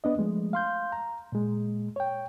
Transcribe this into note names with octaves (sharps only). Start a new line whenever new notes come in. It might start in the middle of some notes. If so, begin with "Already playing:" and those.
B3 D4 D#5
F3 G#3 A3
F5 C6 G6
A#5
A#2 G#3
C#5 G5